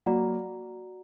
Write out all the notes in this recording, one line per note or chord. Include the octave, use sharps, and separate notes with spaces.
F#3 A#3 F#4 D5 F#5 A#5